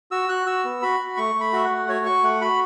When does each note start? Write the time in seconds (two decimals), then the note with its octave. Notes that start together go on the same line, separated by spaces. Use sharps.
0.11 F#4 E6
0.29 F#4 F#6
0.46 F#4 E6
0.64 B3
0.82 F#4 B5
1.00 F#4
1.17 A3 C#6
1.35 A3
1.40 B5
1.53 F#4 E5
1.64 F#5
1.70 A3
1.89 F#4 C#5
2.05 F#4 C#6
2.24 A3 F#5
2.41 F#4 B5